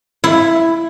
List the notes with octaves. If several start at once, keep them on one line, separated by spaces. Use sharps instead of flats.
E4